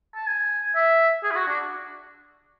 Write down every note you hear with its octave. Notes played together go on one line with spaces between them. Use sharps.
A5
G#5
E5
G#4
E4
F#4
D4